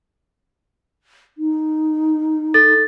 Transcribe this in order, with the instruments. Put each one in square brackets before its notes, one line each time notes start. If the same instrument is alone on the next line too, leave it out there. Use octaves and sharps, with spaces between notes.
[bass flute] D#4
[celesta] A4 A6